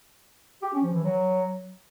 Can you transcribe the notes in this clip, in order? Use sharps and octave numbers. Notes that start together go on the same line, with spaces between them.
G4
C#4
F3
E3
F#3